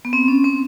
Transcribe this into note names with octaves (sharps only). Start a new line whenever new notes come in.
B3
C4
C#4
C4